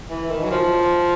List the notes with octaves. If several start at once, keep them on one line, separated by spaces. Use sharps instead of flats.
E3
D#3
F#3
F3